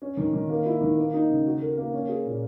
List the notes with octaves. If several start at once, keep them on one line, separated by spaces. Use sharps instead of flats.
C#4
D#3
D#3
A#3
E4
D#3
A#3
D#4
C#3
F#4
A#4
A#3
C#4
G#4
A#2